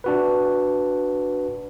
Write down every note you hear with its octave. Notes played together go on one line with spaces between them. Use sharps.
D4 F#4 B4